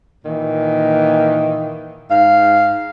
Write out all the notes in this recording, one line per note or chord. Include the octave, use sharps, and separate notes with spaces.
A#2 D#3 E3
G#2 F5